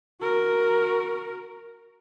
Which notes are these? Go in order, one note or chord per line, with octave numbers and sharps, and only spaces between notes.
F#4 A#4